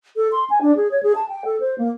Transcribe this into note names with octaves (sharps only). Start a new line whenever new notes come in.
A4
C6
G#5
D4
G#4
C#5
G#4
A5
G5
A4
C5
A#3